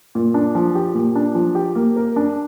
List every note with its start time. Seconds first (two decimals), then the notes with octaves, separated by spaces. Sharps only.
0.15 A#2
0.34 D4
0.55 F3
0.75 G4
0.95 A#2
1.15 D4
1.35 F3
1.55 G4
1.75 A#3
1.96 A#4
2.16 D4